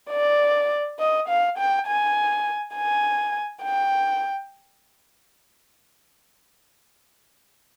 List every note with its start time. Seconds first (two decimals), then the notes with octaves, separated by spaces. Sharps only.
0.11 D5
0.99 D#5
1.28 F5
1.58 G5
1.87 G#5
2.75 G#5
3.63 G5